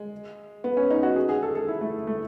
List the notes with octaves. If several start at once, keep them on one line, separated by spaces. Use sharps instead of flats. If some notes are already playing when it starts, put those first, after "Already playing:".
Already playing: G#3
B3
C#4
D#4
F#4
G#4
G#4
A4
A4
E4
A3
A3